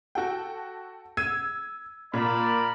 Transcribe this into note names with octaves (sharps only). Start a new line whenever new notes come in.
F#4 A4 G5
E6 G#6 D#7
A#2 A#4 D5 B5